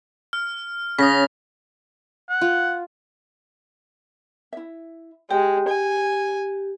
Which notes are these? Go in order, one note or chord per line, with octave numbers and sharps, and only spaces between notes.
F6
C#3 D#6 A#6 B6
F#5
F4
E4 E5
G#3 G4 G5
G#5